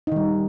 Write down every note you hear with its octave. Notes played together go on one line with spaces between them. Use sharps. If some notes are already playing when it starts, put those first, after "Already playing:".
D#3 G3 D#4